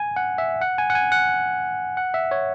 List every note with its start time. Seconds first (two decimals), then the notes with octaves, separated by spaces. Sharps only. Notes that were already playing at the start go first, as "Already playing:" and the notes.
Already playing: G#5
0.16 F#5
0.38 E5
0.61 F#5
0.78 G#5
0.90 F#5
0.95 G#5
1.12 F#5
1.97 F#5
2.14 E5
2.31 C#5